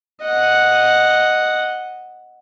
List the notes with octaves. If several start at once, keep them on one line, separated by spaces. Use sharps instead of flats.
D#5 F#5